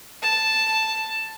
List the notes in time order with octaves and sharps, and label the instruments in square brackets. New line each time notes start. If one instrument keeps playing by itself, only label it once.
[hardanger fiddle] A5